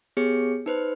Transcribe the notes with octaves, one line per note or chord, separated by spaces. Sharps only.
B3 G4 G#4 C#5 C#7
D#4 B4 C5